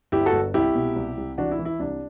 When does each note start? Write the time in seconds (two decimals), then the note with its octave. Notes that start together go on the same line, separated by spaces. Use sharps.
0.12 G1 E4 G4
0.26 F#4 A4
0.33 G1
0.54 C2 E4 G4
0.75 B2
0.96 C2
1.17 C2
1.38 E3 D4 F#4
1.51 E4
1.59 E3
1.65 E4
1.79 C2 D4